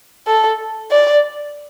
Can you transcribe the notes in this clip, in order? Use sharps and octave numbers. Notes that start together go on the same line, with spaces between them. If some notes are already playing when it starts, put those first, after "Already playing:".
A4
D5